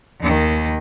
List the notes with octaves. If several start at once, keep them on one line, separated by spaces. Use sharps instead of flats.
D#2 D#3